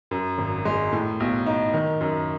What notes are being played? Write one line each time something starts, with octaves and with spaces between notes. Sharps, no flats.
F#2
G#1
G#3
A2
B1
D#4
D#3
F#2